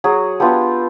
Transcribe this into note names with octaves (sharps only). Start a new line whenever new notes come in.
F#3 F#4 G#4
B3 D4 F4 G4 A4